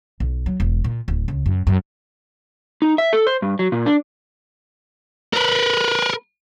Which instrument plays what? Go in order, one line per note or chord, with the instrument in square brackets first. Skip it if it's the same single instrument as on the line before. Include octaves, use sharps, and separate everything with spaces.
[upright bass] B1
F#3
E1
A#2
D1
C#2
F#2
F#2
[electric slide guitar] D#4
E5
A4
C5
G2
F#3
A#2
D4
[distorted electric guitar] A#4 B4